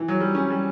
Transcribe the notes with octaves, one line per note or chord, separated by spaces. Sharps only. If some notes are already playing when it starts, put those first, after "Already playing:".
Already playing: E3
F#3
G3
C#4
G3